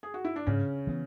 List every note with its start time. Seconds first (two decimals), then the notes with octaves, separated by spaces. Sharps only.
0.03 G#4
0.14 F#4
0.25 E4
0.36 D4
0.46 G#2 C#3 C#4
0.87 E3 B3